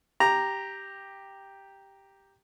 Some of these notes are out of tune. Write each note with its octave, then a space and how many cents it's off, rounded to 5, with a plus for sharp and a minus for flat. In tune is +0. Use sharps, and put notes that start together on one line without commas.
G4 +0 A#5 +0